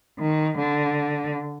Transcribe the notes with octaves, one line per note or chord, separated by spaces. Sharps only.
D#3
D3